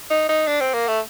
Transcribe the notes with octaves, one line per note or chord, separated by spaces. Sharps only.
D#4
D#4
D4
C4
A#3
A3